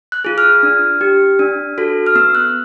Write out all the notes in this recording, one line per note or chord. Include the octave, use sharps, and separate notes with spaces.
F#6
F4 G#4
F6
D4
G4
D4
F#4 A4
F6
B3 E6
F#6